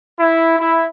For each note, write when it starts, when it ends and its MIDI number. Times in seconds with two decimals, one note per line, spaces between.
0.19 0.56 64
0.59 0.84 64